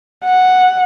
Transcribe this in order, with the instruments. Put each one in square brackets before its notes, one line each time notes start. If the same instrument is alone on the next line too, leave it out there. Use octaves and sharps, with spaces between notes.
[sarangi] F#5